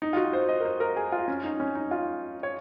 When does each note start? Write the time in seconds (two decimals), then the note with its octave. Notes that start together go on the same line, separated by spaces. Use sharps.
0.02 D#4
0.13 F4
0.17 F#4
0.33 C5
0.49 D#5
0.60 A#4
0.65 C5
0.80 A#4
0.96 G#4
1.12 F4
1.28 C#4
1.43 D#4
1.60 C#4
1.75 D#4
1.91 F4
2.43 C#5